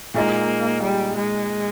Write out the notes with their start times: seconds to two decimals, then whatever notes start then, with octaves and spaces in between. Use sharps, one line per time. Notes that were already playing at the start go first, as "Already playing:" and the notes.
0.14 A#2 G#3 A#3 D#4
0.82 G3
1.16 G#3